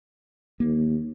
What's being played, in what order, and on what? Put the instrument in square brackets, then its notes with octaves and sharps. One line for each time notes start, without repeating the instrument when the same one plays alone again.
[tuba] D#2 [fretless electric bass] A#3